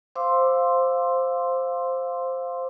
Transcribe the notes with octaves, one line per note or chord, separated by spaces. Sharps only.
C5 F5 C6 D6 E6